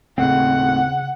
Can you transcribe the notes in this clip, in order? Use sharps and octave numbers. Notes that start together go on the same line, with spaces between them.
D#1 A2 C#3 C4 F#5